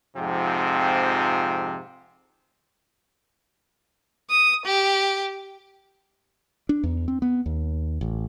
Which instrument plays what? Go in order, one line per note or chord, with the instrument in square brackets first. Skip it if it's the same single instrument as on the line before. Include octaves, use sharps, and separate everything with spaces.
[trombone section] F2 G#2 C3 F3 C4
[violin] D#6
G4
[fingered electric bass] D4
E2
C4
B3
D#2
A1